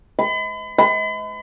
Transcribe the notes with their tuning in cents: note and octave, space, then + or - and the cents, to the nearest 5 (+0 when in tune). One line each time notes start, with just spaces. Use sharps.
B5 +40
B5 +40